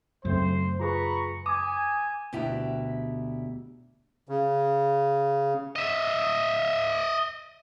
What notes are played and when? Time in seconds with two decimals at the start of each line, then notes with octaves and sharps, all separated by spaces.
0.25 F#2 C#3 F#3 A3 C4 C5
0.80 F4 G#4 B4 A#5 B5 C#6
1.46 G#5 D6 D#6
2.33 D2 B2 E4 G4 A#5
4.29 C#3
5.76 D#5 E5